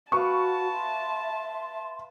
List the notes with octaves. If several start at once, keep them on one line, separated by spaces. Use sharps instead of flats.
F#4 B4 F5 A5 C#6
E5 C6